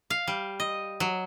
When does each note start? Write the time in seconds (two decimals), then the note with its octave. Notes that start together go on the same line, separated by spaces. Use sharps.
0.10 F5
0.28 G3
0.60 D#5
1.00 F#3